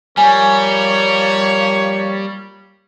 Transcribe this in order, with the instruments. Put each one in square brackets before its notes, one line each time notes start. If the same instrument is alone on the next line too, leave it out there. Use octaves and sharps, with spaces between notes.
[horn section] F3 A#3 C#5 [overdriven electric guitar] G3 [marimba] G#5